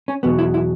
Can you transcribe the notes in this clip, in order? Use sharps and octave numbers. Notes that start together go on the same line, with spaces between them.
C#4
E2 B2 F#3 B3
E4
E4